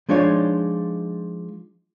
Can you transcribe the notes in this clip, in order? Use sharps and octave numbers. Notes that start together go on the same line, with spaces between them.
F3 G#3 D4 D#4 F4 C#5